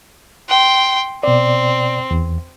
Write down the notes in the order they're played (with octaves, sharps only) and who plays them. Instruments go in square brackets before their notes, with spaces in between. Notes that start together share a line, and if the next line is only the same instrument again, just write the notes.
[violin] G5 C6
[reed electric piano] B2 D5 [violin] C4
[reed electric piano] E2